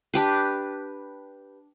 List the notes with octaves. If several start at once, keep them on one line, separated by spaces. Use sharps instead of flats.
D4 G4 B4